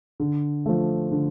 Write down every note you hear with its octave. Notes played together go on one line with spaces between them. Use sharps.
D3
F3 A3
D3